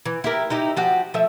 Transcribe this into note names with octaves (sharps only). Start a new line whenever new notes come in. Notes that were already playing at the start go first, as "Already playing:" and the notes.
E3
E4 G4 A#4
D#4 E4 G4
F3 F#4 G4
F3 A3 E5